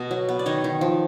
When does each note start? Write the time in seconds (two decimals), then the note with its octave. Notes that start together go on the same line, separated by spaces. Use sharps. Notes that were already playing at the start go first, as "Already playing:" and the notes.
Already playing: B2 D#5
0.11 F#3
0.29 B3
0.39 D5
0.46 D#3 C#5 D#5
0.64 D#3
0.81 F3